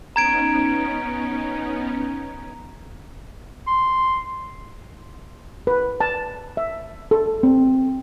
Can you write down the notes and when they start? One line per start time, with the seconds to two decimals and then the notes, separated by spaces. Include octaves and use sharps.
0.16 B3 C#4 D#4 A#5 G#6 D7
3.67 C6
5.67 B4
6.01 A5
6.57 E5
7.11 A4
7.43 C4